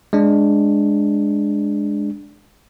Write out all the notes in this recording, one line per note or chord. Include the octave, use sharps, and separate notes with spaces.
G#3 D4